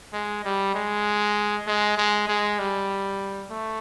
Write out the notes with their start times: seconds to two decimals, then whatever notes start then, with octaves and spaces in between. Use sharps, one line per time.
0.13 G#3
0.45 G3
0.74 G#3
1.67 G#3
1.98 G#3
2.28 G#3
2.59 G3
3.50 A3